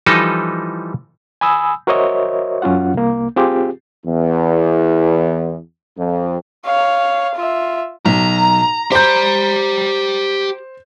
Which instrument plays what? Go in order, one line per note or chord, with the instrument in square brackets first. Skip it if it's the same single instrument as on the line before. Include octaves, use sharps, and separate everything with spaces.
[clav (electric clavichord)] E3 F3 G3 D#4 A4 D#5
[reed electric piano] G#5 B5 D#6 E6
F#4 A#4 C5 C#5 D#5 E5
F#2 C#4 F4 F#5
C2 A#3
C4 F4 G4 G#4
[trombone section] E2
F2
[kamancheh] C#5 F5
F4 E5
[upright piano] B1 [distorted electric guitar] A#5
[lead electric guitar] G4 B5 [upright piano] C5 G6